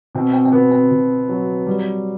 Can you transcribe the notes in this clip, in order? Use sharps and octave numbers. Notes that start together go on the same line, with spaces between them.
B2 C4
C4
C4
B2 B3
C4
B2
F#3
G3